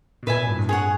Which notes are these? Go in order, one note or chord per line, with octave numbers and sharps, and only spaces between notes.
B2
A#2 B4 E5 G#5
A2
G2
G2
G2 G#4 C#5 F#5